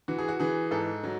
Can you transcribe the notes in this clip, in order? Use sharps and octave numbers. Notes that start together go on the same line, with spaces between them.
E3 F#4
G#4
F#4
E3 G#4
G#2 A4
F#3